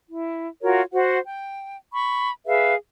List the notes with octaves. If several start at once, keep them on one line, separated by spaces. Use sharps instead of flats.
E4
F4 F#4 A#4 C#5
F#4 C5 F#5
G5
B5 C#6
G#4 B4 E5 F5